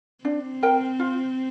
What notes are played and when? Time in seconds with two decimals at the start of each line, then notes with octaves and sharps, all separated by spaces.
0.24 C4 D4
0.63 A#4 G5
0.99 F4